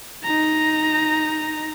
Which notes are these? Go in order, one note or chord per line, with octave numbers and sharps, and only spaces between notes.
D#4 A#5